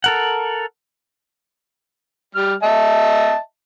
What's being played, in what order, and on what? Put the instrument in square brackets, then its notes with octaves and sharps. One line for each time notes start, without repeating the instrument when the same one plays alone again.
[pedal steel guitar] A4 A#4 F#5
[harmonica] G3 F6
D#5 E5 A5